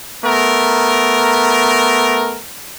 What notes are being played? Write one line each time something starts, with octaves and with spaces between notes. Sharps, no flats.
A3 B3 A#4